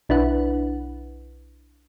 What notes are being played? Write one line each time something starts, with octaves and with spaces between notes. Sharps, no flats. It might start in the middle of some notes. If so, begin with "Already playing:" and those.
B1 D4 E4 B4 F#5